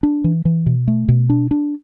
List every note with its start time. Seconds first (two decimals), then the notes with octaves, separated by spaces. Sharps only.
0.03 D4
0.24 E3
0.45 E3
0.66 B2
0.88 A3
1.08 B2
1.30 D4
1.51 D4